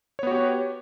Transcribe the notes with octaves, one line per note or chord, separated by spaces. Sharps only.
B3 F#4 G4 C#5